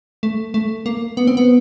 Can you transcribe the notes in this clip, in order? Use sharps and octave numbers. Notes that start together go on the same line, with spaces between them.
A3
A3
A#3
B3
C4
B3